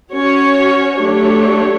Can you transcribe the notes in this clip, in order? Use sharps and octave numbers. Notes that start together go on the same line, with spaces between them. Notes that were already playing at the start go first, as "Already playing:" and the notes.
C#4 F#4 C#5
F#3 A3 D4 G4 C#5